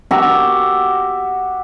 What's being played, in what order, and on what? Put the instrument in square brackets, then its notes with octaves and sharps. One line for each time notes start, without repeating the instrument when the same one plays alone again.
[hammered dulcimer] F#4 G4 E5 A#5